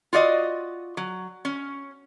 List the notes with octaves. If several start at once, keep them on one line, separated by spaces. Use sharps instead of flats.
F4 F#4 D5 D#5
F#3
C#4